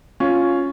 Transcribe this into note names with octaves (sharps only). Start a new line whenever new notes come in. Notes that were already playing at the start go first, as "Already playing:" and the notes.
C#4 F4